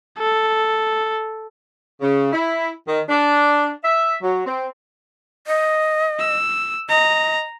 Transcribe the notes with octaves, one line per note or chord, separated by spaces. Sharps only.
A4
C#3
E4
D#3
D4
E5
F#3
C4
D#5
E6
D#5 A#5